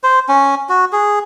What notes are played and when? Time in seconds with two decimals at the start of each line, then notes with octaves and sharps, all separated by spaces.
0.03 C5
0.29 C#4
0.69 F#4
0.92 G#4